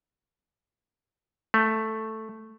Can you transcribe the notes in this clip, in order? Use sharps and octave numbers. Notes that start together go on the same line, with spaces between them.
A3